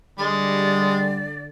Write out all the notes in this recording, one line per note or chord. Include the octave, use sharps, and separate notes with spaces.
D3 G3 G#3 D5